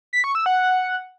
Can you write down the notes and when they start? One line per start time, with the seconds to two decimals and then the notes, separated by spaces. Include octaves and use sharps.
0.13 B6
0.24 C#6
0.35 E6
0.46 F#5